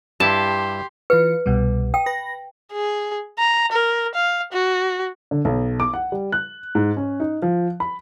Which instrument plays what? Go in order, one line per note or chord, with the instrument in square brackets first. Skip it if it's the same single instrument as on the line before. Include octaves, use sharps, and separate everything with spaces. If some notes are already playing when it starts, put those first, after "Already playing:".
[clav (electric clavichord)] G2 E4 [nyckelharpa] G4 C6 [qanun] A5 [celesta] E7
[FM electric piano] E3 F4 C#7 [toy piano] B4
[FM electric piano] C2 B2 G3
[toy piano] G5 [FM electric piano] D#6
[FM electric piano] B4 A#6
[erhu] G#4
A#5
A#4
F5
F#4
[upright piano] D3
B1
D6
F#5
G3
F#6
G#2
C#4
D#4
F3
B5